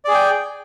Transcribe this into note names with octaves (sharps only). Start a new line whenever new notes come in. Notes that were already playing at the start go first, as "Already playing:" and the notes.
G#4 D5 G5 G#5